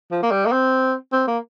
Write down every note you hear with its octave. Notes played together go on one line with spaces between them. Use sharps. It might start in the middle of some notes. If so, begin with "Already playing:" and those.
F3
A#3
G3
A#3
C4
C4
A#3